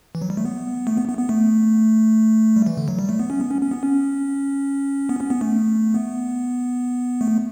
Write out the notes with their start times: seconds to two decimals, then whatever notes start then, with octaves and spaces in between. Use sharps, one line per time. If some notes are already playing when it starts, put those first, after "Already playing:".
0.15 E3
0.22 F#3
0.30 G3
0.37 A3
0.45 B3
0.87 A3
0.97 B3
1.08 B3
1.19 B3
1.29 A3
2.56 G3
2.66 E3
2.77 D3
2.88 F#3
2.99 G3
3.09 A3
3.19 B3
3.30 C#4
3.40 B3
3.51 C#4
3.61 C#4
3.71 B3
3.83 C#4
5.09 B3
5.20 C#4
5.30 B3
5.41 A3
5.94 B3
7.21 A3